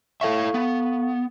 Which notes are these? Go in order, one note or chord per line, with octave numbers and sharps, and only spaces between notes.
E4 A4 C#5 E5 F5 C#6
B3